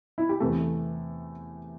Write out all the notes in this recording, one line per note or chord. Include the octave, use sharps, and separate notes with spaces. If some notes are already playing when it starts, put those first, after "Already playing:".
E4
G4
E2 C3 A3 A4